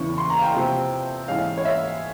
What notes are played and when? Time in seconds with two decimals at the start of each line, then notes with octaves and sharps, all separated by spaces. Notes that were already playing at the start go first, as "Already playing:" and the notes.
Already playing: E2 C#3 E3 C#6
0.18 C6
0.30 A#5
0.38 F5
0.43 G5
0.55 C3 F3 C4
1.28 G#2 E3 G#3 C#4 F5
1.57 C#5
1.65 E5